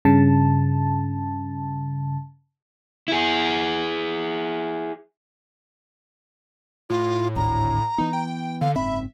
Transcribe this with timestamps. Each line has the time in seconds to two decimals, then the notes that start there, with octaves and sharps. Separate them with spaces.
0.05 G2 C#3 A5
3.08 E4 G#4
6.90 A2 F4
7.36 G#1 D2 D3 A#5
7.98 E3 B3 D#4
8.13 G5
8.61 D3 F5
8.76 F#1 G#2 C4 E5 B5